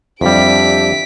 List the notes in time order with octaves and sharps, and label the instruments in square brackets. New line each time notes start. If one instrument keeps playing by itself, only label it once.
[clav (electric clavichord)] F2 G3 [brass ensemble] D4 G4 E5 [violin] B6 D7